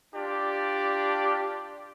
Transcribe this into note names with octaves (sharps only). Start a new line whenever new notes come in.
D4 F4 G4 D5